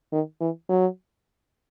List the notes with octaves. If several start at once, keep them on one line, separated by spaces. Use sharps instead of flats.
D#3
E3
F#3